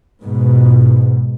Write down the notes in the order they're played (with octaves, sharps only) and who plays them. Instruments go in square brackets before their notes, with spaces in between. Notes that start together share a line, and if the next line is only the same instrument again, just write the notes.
[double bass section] G#2 B2